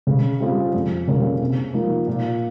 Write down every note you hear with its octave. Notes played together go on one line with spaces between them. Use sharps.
C#3
G3 C4 F4 G#4
F2
C#3 G3 A#3 C#4
C3
F3 A#3 D#4
A#2